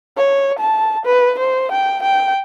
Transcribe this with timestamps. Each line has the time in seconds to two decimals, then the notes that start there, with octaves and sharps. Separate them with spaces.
0.18 C#5
0.59 A5
1.05 B4
1.39 C5
1.72 G5
2.03 G5